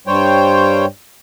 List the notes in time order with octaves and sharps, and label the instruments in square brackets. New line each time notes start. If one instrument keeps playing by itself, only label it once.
[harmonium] G2 G3 C5 C#5 G5